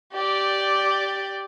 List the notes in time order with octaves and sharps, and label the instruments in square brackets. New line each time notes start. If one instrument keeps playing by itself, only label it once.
[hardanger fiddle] G4 D5